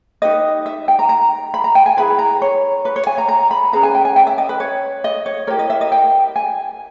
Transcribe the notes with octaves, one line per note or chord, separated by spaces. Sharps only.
D#4 G4 B4 D#5
E5
G5
A#5
A#5
B5
A#5
G5
G#5
E4 G#4 B4 B5
A#5
C#5
B4
C#5
G#5
A#5
A#5
B5
C#4 G#4 B4 A#5
G#5
G5
G#5
G5
E5
D#5
B4
C#5
D#5
C#5
E4 G4 A#4 C#5
D#5
E5
D#5
G5
G#5